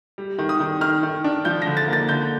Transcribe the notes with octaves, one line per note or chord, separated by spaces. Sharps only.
G3
D#3
D#6
D#3
D#3 F6
D#3
D4
F3 G6
A#6
D3
A6
A#3
A6
D3 G6